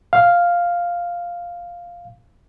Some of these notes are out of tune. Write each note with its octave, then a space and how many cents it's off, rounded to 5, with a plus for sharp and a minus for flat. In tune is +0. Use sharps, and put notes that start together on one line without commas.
F5 +0